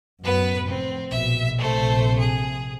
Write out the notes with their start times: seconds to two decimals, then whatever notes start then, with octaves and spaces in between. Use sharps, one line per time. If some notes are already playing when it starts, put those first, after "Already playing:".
0.24 F#2 A2 B3 B4
0.67 F1 C4
1.11 A#1 B2 E5
1.58 A#1 C3 A3 C5
2.19 G#4